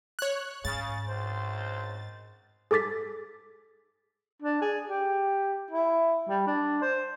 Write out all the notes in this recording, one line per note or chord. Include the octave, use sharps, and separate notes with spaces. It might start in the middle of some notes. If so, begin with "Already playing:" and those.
C#5 F#6
G#2 C#3 A6
G#1 C#2 C5
G#4 A4 D6 A6 B6
D4
G#4
G4
E4
G3
D4
C5